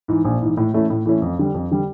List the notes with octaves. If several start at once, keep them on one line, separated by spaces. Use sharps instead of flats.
G#2 E3
A#1
G#2 E3
A2
E3 A3 C#4 E4
A2
E3 A3 C#4 E4
F2
D3 G3
F2
D3 G3